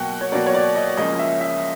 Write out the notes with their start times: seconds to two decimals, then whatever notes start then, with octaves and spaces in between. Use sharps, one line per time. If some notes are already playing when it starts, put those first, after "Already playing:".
Already playing: B2 F#3 A#3 F#5 G5
0.21 C#5
0.32 B2 F#3 A#3 D5
0.46 C#5
0.54 D5
0.76 D#5
0.97 C#2 C#3 F3 A#3 C#4 D#5
1.19 E5
1.41 E5